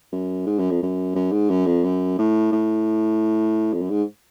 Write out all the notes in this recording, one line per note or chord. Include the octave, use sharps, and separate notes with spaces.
F#2
G#2
F#2
F2
F#2
F#2
G#2
F#2
F2
F#2
A2
A2
F2
F#2
G#2